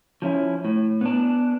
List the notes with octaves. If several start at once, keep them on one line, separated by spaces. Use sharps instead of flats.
F3 C#4 E4
A2
B3 D4